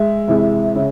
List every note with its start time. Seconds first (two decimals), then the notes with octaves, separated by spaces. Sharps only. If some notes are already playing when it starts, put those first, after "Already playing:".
Already playing: G#3 E5
0.28 C3 E3 G#3
0.76 C#3